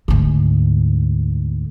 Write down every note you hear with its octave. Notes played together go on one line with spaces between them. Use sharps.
D2 G#2